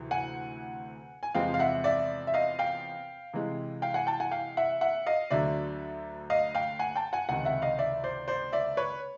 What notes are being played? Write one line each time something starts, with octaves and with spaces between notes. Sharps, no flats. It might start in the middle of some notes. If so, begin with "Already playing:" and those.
Already playing: D2 C3 E3
F#5 G#5
G#5
E2 C3 F3 G#3 C4 F5 G5
F5
E5 F#5
D5 E5
E5
D#5 F5
F5 G5
C3 E3 G#3
F5 G5
F#5 G#5
G5 A5
F#5 G#5
F5 G5
E5 F#5
E5 F#5
D#5 F5
D2 D3 F#3 D5 E5
D#5 F5
F5 G5
F#5 G#5
G5 A5
F#5 G#5
C#2 C3 D#3 F#5 G#5
E5 F#5
D#5 F5
D5 E5
C5 D5
C5 D5
D5 E5
B4 C#5